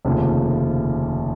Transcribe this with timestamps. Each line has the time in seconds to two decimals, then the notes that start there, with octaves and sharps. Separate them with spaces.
0.05 F1 D#2 C#3 F3